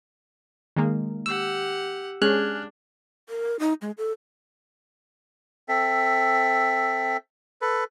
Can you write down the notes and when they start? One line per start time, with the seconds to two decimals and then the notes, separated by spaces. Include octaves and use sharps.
0.76 D#3 G#3 A#3
1.26 G4 F#5 E6
2.22 G#3 C#4 D4 G#4 F6 F#6
3.29 A#4
3.59 D#4
3.82 G#3
3.98 A4
5.69 C4 A4 E5
7.62 A4 B4